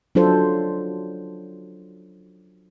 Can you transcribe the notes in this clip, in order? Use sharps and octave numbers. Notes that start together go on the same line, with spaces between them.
F#3 D4 F4 A4 C5